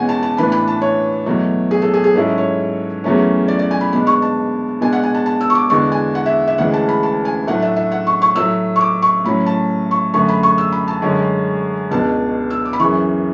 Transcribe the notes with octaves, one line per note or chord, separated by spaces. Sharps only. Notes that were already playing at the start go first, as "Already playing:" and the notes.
Already playing: E2 B2 G#3 C#4 F#5 G#5
A5
A5
A2 E3 B3 D4 B5
B5
A5
C#5
E2 B2 F#3 A3
G#4
A4
G#4
G#4
G#2 F#3 C#4 E4 A4
C#5
E2 C#3 F#3 A3 C#4
D5
D5
G#5
B5
B2 G#3 D4 B5
C#6
A5
B2 G#3 D4 G#5
F#5
G#5
A5
A5
E6
C#6
D6
E2 D3 G#3 D4 C#6
G#5
F#5
E5
E5
D2 C#3 E3 G#3 F#5
A5
B5
A5
G#5
A2 F#3 A3 D4 F#5
E5
E5
F#5
C#6
C#6
A2 F#3 A3 E6
C#6
D6
C#6
A2 F#3 C#4 B5
A5
C#6
F#2 D3 A3 C#6
B5
C#6
E6
B5
A5
F#2 D3 G#3 C#4
C#2 B2 G#3 D4 A5
E6
D6
B5
F#2 C#3 E3 C#6